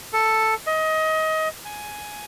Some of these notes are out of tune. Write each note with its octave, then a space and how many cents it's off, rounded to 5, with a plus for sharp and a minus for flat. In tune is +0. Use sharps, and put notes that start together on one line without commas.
A4 +5
D#5 +25
G#5 +10